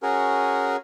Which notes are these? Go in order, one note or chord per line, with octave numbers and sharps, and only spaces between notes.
C#4 F#4 G#4 A#4